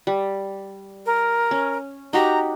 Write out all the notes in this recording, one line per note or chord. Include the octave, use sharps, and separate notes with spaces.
G3
A#4
C#4
D#4 F#4 G4 A#5